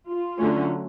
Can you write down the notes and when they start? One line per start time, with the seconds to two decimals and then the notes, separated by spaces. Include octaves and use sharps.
0.09 F4
0.38 D3 F#3 A3 C#4